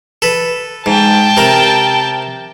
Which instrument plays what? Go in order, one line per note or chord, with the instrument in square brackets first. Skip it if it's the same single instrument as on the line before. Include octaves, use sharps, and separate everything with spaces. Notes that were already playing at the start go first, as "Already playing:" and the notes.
[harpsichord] A4 B4
[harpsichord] G#2 [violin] G5 A5
[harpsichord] C3 A#4